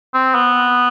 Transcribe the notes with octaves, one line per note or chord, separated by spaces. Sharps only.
C4
B3